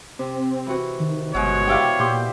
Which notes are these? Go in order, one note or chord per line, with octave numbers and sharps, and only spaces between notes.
C3 C4
E3 F#4
D#3
G1 B2 G#3 C#5
E4 G4 D5 E5 F5 G5
A#2 G4 C6